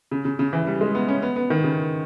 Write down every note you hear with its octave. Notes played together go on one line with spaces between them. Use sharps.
C#3
C#3
C#3
E3
G3
G#3
B3
C#4
B3
B3
D#3
C#3